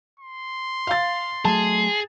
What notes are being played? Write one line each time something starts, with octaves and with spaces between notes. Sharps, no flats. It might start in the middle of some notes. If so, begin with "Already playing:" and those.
C6
F5 A6
F#3 A3 G#4 A5